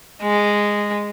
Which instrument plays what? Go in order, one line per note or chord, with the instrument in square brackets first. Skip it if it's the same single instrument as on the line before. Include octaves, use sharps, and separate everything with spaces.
[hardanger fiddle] G#3